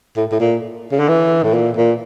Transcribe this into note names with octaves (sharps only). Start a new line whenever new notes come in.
A2
A2
A#2
C#3
D3
E3
A2
A#2
A#2